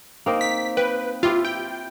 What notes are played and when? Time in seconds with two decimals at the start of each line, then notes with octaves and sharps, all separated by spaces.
0.26 A#3 C4 D#4
0.41 B6
0.77 B4 G5
1.23 E4 F4 G4
1.45 G5